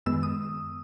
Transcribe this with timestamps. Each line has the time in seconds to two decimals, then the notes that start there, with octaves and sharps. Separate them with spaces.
0.06 F#2 D#3 G#3 B3 E6
0.23 D#6